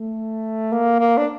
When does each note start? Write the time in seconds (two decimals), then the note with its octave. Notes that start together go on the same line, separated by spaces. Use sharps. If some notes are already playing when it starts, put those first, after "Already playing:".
Already playing: A3
0.73 A#3
1.00 A#3
1.18 D4